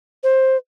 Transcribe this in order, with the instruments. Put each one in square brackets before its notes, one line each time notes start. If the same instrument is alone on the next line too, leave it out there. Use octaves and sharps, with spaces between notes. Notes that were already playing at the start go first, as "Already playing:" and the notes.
[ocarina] C5